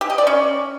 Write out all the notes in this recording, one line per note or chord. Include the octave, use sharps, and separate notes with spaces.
G4
D#5
D5
C#4